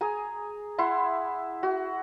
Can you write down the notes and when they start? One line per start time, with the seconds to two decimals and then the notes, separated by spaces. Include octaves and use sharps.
0.01 G#4 G#5 A#5
0.78 E4 F#5 C6
1.63 F#4